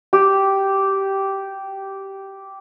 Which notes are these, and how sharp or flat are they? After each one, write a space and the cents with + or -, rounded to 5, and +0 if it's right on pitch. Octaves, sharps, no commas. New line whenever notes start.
G4 -10